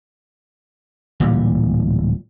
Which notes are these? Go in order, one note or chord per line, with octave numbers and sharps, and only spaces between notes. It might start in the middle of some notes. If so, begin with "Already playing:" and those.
D1 A#2 E3 G3